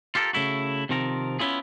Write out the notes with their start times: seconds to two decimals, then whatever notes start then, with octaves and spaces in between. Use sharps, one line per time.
0.15 F4 G4 A4 A#4
0.33 C#3 A3 E4 F#4
0.89 C3 D#3 F3 C4 A#4
1.39 B3 C#4 E4 F4 G#4